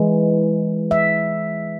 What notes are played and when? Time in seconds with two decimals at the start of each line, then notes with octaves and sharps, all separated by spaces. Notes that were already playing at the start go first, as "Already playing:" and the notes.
Already playing: E3 G#3
0.91 E5